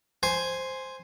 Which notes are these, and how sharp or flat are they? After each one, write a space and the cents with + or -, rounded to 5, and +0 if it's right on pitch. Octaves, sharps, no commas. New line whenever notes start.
C5 +0 G#5 +0